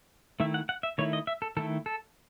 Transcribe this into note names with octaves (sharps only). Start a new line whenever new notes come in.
D#3 A3 E4 E5
F#5
F#5
E5
D#3 A3 E4 C#5
D#5
E5
A4
D#3 A3 E4 A4
A4